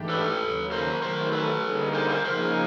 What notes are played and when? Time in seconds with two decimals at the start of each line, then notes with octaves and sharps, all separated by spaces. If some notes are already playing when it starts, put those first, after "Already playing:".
Already playing: G#2 E3 A3 D4 G4
0.09 A4 B4
0.41 D#2 C#3 F#3
0.71 A#4 C5
1.02 D#3 F#3 A3 A#4 C5
1.32 A4 B4
1.63 D3 G3 A#3 D#4 G#4
1.94 A#4 C5
2.09 A#4 C5
2.25 C#3 F3 A#3 D#4 G#4 A#4 C5